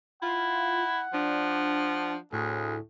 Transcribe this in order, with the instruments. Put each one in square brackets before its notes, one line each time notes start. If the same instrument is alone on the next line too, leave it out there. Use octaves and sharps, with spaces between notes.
[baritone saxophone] E4 [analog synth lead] F4 [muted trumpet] F#5
[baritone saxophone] F3 [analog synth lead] D4
[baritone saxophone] D2 [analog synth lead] A2 [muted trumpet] G#4